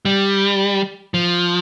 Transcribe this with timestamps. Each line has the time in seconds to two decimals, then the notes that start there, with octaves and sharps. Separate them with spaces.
0.05 G3
1.14 F3